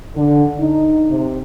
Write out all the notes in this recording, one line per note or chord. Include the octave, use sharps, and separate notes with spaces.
D3
D#4
C3